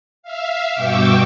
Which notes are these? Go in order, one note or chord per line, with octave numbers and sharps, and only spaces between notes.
E5 F5
G2 B2 G5 C#6 D6 E6